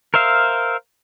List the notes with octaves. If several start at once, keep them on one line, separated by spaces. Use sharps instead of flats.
A#4 C5 E5 F5